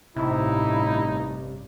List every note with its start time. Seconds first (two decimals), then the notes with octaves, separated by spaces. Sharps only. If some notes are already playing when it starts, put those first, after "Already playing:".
0.17 A1 G2 C3 D#4 E4